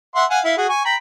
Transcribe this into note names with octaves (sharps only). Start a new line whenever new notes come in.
E5 F#5 C6
F5 F#5 G#5
E4 E5 F5
F#4 G#4 F#5
G#5 C#6
G5 A#5 B5